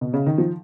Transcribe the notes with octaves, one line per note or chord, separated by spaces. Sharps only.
B2
C#3
D#3
F3